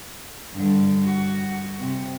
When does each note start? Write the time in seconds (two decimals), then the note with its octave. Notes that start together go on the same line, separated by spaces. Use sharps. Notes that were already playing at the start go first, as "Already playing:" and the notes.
0.53 G2 D3
1.05 F#4
1.80 C3